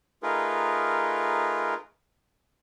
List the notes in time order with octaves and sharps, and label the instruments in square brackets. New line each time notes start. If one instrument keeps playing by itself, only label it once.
[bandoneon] A3 D#4 F4 G#4 A#4 B4